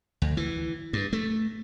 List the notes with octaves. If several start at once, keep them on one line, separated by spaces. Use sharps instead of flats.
D2
E3
G2
A3